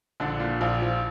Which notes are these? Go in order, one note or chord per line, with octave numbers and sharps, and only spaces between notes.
A#1 D3 D4
A#2
A#1 F3 F4
F3